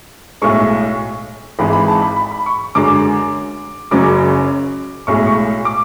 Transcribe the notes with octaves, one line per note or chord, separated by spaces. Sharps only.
B1 A2 G#3 C#6
G#1 G#2 E3 G#3 B5
B5
A5
B5
B5
B5
C#6
F#2 D3 G#3 D6
F#1 F#2 C#3 F#3 C#4 D6
B1 A2 G#3 C#6
C#6
D6